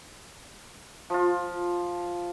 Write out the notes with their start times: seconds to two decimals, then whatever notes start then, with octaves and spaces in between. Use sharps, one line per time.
1.10 F3 F4